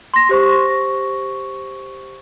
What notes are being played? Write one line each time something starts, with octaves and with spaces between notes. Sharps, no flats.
C6 A#6
G4 C5 C#6